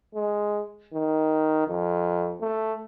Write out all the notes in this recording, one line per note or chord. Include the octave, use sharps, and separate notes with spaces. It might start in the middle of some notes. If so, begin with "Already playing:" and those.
G#3
D#3
F2
A3